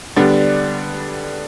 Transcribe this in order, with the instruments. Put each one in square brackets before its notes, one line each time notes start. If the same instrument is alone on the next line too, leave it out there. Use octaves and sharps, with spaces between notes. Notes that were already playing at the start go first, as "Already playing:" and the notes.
[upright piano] D3 G3 B3 D4